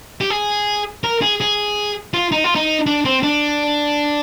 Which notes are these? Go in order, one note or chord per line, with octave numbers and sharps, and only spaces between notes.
G4
G#4
A#4
G#4
G#4
F4
D#4
F4
D#4
D4
C4
D4